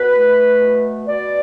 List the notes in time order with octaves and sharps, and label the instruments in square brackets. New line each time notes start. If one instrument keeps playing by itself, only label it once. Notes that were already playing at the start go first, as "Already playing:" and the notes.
Already playing: [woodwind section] B2 B4
A3
B2
B2 D5